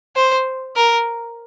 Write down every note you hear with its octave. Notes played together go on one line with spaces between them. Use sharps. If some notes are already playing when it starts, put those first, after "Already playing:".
C5
A#4